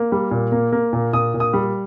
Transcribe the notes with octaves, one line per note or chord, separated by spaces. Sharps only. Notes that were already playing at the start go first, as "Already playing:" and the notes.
Already playing: A#3
G3
A#2
A#3
A#3
A#2
A#2 D#6
A#2
D#6
G3